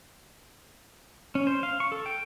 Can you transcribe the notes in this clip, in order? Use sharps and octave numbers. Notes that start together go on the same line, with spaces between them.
C#4
C5
F5
C#6
A4
G5